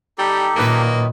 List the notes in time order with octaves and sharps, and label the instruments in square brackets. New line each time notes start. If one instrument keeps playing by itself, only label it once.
[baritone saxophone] G3 [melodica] D#4 G4 A4
[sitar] F#2 D#3 B4 [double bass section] A#2 [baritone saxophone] A#3